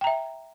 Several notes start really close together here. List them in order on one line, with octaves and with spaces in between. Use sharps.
G5 A#5 E5